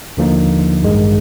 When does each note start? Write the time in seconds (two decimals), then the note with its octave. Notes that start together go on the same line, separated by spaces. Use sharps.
0.17 D#2 D3 F3 A#3 D#4
0.82 A1 G2 D#3 G#3